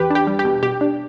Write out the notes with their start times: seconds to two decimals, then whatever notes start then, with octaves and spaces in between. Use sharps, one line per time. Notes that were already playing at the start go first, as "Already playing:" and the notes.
Already playing: E2 G4 B4
0.10 D4 G4
0.27 G3
0.39 G4
0.45 B2
0.62 B2 G4
0.81 D4